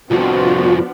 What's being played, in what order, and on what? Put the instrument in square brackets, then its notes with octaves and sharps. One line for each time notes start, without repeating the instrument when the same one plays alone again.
[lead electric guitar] C2 F2 [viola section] F3 B3 D4 [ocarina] F4 [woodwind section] F#4